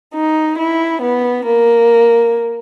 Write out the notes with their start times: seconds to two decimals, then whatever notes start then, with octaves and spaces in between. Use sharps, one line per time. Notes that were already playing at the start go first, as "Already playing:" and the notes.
0.14 D#4
0.58 E4
1.02 B3
1.45 A#3